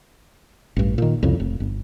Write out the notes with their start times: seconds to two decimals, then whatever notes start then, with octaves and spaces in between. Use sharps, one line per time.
0.76 A1 G2
0.98 A#2 D#3
1.23 C2 F2 C#3
1.40 F1
1.60 G1